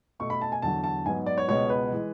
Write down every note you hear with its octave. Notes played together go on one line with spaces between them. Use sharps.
B2 A3 C#6
B5
A5
G#5
E2 D3 F#3 A5
A5
G#2 F#3 B3 G#5
D5
C#5
C#2 B2 G#3 B3 C#5
B4
E3 G#3